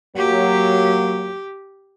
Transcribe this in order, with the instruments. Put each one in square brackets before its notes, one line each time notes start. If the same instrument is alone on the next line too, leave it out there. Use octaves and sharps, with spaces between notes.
[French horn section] F#3 A#3 [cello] G4